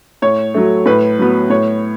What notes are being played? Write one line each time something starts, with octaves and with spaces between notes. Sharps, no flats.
A2 C#5
F#3 A3
A2 B4
F#3 B3
A2 C#5